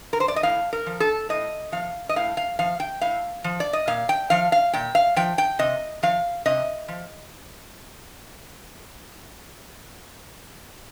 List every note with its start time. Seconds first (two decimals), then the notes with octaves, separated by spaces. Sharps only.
0.13 A#4
0.20 C5
0.28 D5
0.36 D#5
0.43 A2 F5
0.73 A#4
0.86 F3
1.00 A4
1.29 A2 D#5
1.72 F3 F5
2.09 D#5
2.16 A2 F5
2.37 F5
2.59 F3 F5
2.80 G5
3.01 A2 F5
3.44 F3
3.60 D5
3.73 D#5
3.87 A#2 F5
4.09 G5
4.30 F3 F5
4.52 F5
4.73 A#2 G5
4.95 F5
5.16 F3 G5
5.38 G5
5.59 C3 D#5
6.03 F3 F5
6.46 C3 D#5
6.88 F3